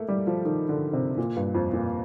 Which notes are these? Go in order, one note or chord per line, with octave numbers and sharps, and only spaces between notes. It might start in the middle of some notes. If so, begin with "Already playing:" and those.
Already playing: A3 A#3
G3
F3
D#3
D3
C3
A#2
G2
F2
A#2